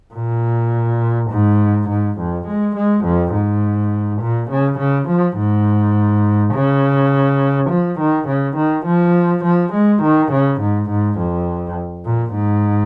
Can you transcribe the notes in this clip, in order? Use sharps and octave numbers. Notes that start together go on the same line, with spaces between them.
A#2
G#2
G#2
F2
G#3
G#3
F2
G#2
A#2
C#3
C#3
F3
G#2
C#3
F3
D#3
C#3
D#3
F3
F3
G#3
D#3
C#3
G#2
G#2
F2
A#2
G#2